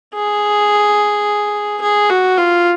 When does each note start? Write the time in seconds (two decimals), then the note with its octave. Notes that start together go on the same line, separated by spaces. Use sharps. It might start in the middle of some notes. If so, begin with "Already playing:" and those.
0.14 G#4
1.81 G#4
2.10 F#4
2.38 F4